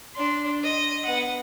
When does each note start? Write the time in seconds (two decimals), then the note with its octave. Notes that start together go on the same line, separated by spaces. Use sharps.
0.15 D4 C6
0.63 D#5
1.05 B3 F#5